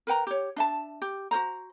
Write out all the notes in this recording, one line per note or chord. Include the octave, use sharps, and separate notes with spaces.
A#4 B4 G5 A#5
G4 C#5
D4 E5 A5
G4
F#4 A#4 C5 A#5